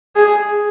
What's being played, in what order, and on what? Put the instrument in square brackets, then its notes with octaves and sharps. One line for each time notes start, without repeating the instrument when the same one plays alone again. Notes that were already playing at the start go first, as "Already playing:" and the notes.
[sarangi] G#4